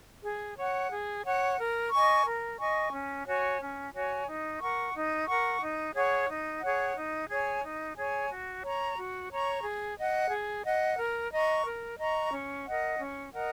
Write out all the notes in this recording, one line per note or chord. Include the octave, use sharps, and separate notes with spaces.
G#4
C#5 F#5
G#4
C#5 F#5
A#4
D#5 G#5 C#6
A#4
D#5 G#5 C#6
C#4
F#4 C#5 G#5
C#4
F#4 C#5 G#5
D#4
A#4 F#5 C#6
D#4
A#4 F#5 C#6
D#4
G#4 C#5 F#5
D#4
G#4 C#5 F#5
D#4
G#4 C#5 G#5
D#4
G#4 C#5 G#5
F#4
C#5 A#5 C#6
F#4
C#5 A#5 C#6
G#4
D#5 F#5
G#4
D#5 F#5
A#4
D#5 A#5 C#6
A#4
D#5 A#5 C#6
C#4
A#4 D#5 F#5
C#4
A#4 D#5 F#5